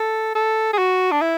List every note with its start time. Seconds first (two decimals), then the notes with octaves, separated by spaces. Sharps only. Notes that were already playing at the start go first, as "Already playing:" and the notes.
Already playing: A4
0.35 A4
0.73 G#4
0.78 F#4
1.11 D4
1.21 E4